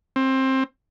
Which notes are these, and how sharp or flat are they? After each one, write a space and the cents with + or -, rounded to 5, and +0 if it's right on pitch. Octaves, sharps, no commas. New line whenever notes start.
C4 +20